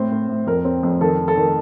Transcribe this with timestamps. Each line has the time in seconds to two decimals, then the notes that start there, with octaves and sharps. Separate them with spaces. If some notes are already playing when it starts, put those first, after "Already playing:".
Already playing: A2 C4 C5
0.11 A2
0.29 A2
0.47 F2 A#4
0.65 C4
0.83 F2
1.01 D#3 A4
1.19 D#3
1.28 A4
1.37 D#3